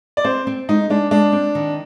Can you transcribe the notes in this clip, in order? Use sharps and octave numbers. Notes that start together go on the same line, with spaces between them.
D5
C4 C5
C4
G#3 D#4
G#3 D4
G#3 D4
C4
D#3